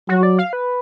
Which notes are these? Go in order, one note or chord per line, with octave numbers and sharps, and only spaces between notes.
F#3 F#4
D5
F5
B4